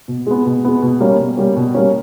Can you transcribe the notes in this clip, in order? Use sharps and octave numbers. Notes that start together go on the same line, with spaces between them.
B2
G#3 B3
B2
G#3 B3
B2
G3 A#3 C#4
B2
G3 A#3 C#4
B2
G3 A#3 C#4